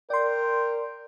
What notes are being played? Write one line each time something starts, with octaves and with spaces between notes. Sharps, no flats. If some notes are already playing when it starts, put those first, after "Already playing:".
A#4 D5 G5 C6